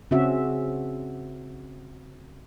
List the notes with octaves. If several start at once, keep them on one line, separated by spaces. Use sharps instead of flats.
C#3 C4 C#4 F#4 E5